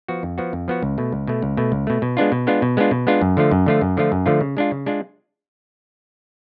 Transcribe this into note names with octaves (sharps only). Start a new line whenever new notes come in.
F3 B3 F#4
F2
F3 B3 F#4
F2
F3 B3 F#4
C#2
B2 A3
C#2
B2 A3
C#2
B2 A3
C#2
B2 A3
B2
G#3 B3 D4 F4
B2
G#3 B3 D4 F4
B2
G#3 B3 D4 F4
B2
G#3 B3 D4 F4
F#2
D3 F3 A3 F4
F#2
D3 F3 A3 F4
F#2
D3 F3 A3 F4
F#2
D3 F3 A3 F4
C#3
G#3 D4 F4
C#3
G#3 D4 F4